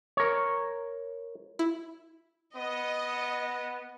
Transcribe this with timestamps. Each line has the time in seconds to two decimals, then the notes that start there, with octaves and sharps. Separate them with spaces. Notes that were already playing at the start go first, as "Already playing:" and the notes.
0.17 A#4 C#5
1.59 E4
2.56 B3 D#5